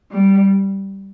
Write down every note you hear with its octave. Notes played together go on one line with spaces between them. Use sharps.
G3